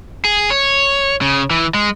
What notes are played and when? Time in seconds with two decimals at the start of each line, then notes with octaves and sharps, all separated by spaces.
0.25 G#4
0.50 C#5
1.21 C#3
1.50 E3
1.74 G#3